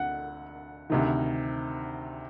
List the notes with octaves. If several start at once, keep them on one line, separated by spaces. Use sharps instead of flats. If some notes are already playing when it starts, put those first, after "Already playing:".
Already playing: D2 D3 F#5
D2 C3 D#3